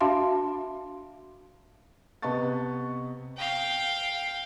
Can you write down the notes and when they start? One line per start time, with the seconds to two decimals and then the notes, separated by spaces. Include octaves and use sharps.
0.01 D4 F#4 E5 F5 A5 C6
2.22 C3 B3 D#5 A5 C#6 A6
3.37 F5 G5